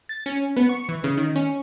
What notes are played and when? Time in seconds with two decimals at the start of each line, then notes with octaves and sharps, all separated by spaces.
0.09 A6
0.26 C#4
0.57 B3
0.69 C#6
0.89 E3
1.04 C#3
1.17 D#3
1.36 C#4